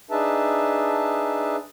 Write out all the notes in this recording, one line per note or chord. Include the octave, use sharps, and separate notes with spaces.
D4 D#4 G#4 B4 E5 A5